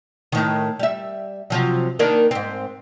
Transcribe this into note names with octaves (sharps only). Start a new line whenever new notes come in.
A2 D#3
G3 E5
C3 F3 F#3
D#3 A#3 D4
G#2 C4